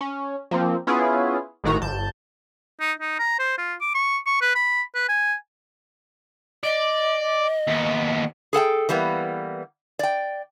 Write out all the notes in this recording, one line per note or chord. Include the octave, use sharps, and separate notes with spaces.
C#4
F3 A#3 C4
B3 C#4 E4 F4 G#4
G#1 A2 D#3 F#4 A#5
G1 A5 G6
D#4
D#4
A#5
C5
F4
D6
C#6
C#6
B4
B5
B4
G#5
D5 D#5
D#2 B3
G#4 A4 F#5 G5
E3 G3 A#3 B3
D5 G5